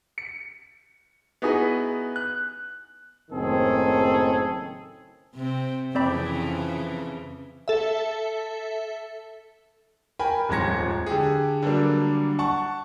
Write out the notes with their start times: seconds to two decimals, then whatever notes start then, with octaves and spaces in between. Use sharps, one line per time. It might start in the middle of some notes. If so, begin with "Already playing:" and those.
0.18 C#7
1.42 B3 D#4 E4 F#4 G#4 B4
2.16 F#6
3.31 F#1 A2 D#3 C4 G#4 A4
5.34 C3 C4
5.95 F2 C#3 E3 C4 D5 B5
7.68 A4 E5
10.19 A#4 G5 G#5 B5
10.49 D#1 F2 G#2 G#6 A#6 C#7
11.06 D3 G4 G#4
11.63 D3 F#3 G3 A#3 D4
12.39 F#5 A5 C#6